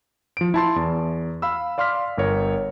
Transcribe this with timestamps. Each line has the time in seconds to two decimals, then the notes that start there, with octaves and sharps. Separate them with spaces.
0.37 F3 D7
0.54 E4 A5 C6
0.76 E2
1.42 F5 B5 E6
1.78 D5 F5 C6 D6 F6 B6
2.18 G1 A#4 C#5